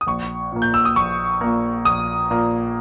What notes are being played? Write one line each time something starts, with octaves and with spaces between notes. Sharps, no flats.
D#6
A#1 C#6
A#2 A#3
G6
E6
D#6
A#1 C#6
A#2 A#3
A#1 D#6
A#2 A#3